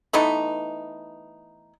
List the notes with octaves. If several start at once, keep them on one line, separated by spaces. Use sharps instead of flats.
E3 A3 B3 D#4